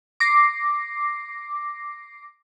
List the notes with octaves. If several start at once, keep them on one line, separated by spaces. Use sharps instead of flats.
D6 A#6 C7